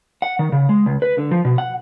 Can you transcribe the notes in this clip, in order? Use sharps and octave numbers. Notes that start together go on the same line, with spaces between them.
F#5
D#3
C#3
G#3
C#2
B4
D3
F3
B2
F#5